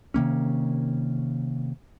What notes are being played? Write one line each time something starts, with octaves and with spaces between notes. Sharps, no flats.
C3 D#3 A#3 C#4